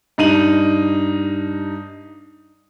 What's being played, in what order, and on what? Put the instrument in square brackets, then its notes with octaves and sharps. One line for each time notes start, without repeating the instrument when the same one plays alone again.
[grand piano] G2 D#4 D#7 F#7